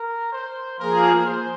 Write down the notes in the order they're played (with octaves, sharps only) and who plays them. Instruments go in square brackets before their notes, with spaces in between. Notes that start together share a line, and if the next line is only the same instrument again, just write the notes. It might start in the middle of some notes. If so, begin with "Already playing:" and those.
Already playing: [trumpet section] A#4
C5
[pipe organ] F3 A#3 G#4 [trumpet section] A#4
[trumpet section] C5